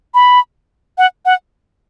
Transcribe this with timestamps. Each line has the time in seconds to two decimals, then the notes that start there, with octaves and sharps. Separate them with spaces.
0.14 B5
0.98 F#5
1.25 F#5